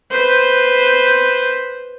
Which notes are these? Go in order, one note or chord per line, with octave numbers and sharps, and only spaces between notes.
B4 C5